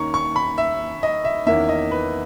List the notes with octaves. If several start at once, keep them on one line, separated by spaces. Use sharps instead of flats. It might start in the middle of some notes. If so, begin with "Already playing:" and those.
Already playing: D#2 D#3 A#3 C#4 A#5 C#6
C#6
B5
E5
D#5
E5
E2 D#3 A#3 C#4 E5
D#5
B4